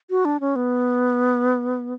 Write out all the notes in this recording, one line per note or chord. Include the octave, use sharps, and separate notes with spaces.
F#4
D4
C#4
B3